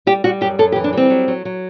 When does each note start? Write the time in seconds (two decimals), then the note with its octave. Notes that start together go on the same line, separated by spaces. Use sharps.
0.07 G3 G4
0.24 G3 F#4
0.41 F#2 G4
0.59 F#2 A4
0.72 G4
0.76 E3
0.84 D4
0.93 G3 C4
1.10 F#3
1.28 F#3
1.45 F#3